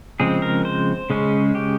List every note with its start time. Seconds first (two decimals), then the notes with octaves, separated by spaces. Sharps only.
0.20 C#3 F3 G#3 C4 G#4
0.42 A#4
0.65 C5
1.10 C#3 G#3 C#4
1.55 G4